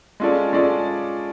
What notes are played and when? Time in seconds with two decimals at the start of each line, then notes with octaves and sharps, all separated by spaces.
0.20 G#3 C#4 F4 A4 D5
0.53 G#3 C#4 F4 A4 D5